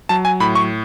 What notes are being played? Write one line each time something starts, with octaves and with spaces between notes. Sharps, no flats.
F#3 A5
G#5
A2 B5
C#6